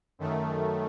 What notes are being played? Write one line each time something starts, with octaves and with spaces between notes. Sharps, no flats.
F#2 D#3 A3